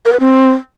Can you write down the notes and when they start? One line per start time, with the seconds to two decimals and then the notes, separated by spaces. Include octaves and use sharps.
0.05 A#4
0.13 B4
0.20 C4